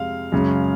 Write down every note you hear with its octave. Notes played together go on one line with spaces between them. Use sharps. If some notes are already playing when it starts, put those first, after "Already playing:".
Already playing: F2 C3 G#3 F5
F#2 C#3 G#3